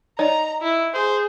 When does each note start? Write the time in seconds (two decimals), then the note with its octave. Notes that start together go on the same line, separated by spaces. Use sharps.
0.19 D#4 C#5 D5 A#5
0.62 E4
0.94 G#4 C5